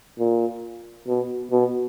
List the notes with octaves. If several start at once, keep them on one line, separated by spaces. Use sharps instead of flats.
A#2
B2
B2